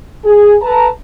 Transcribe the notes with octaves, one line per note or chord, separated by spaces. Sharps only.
G#4
A4 B4 A5 A#5